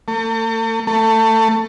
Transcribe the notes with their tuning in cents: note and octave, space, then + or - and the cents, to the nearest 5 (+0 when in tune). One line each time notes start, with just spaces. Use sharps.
A3 +45
A3 +25